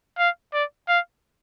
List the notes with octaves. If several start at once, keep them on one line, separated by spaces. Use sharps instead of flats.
F5
D5
F5